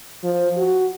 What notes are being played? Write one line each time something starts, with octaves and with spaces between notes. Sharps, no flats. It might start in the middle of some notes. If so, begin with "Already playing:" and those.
F3
F#4